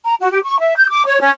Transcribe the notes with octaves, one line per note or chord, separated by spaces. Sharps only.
A#5
F#4
G4
C#6
E5
G6
D6
C#5
C#4